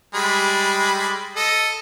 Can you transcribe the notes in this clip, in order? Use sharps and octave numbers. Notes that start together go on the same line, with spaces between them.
G3 G#3 B5
A4 D#5